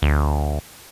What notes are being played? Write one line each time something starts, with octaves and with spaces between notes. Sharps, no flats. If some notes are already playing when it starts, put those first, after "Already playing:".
D2